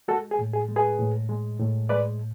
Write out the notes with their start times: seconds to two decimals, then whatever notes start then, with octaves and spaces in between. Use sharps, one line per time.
0.08 G#3 F#4 A4
0.31 G#4
0.39 A2
0.53 G#4
0.69 G#3
0.76 G#4 B4
0.99 A2
1.29 G#3
1.60 A2
1.89 G#3 B4 D5